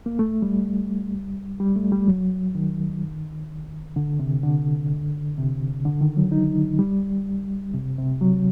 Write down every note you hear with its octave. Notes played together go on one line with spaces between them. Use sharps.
A#3
A3
G3
G3
A3
G3
F#3
D#3
D3
C3
D3
C3
D3
D#3
F#3
D#4
G3
C3
C3
F#3